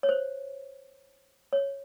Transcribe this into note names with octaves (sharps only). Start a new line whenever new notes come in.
C#5
C5
C#5